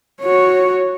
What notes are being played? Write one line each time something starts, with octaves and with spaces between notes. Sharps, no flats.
F#4 C#5